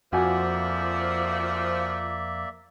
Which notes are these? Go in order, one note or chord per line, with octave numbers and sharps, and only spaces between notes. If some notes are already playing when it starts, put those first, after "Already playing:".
F2 F3 A#3 F#4 D5 E5 G#5